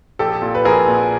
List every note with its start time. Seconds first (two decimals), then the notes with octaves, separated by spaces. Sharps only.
0.19 A#1 G4 A4
0.42 A#2
0.55 B4
0.65 A#1 G#4 A#4
0.88 A#2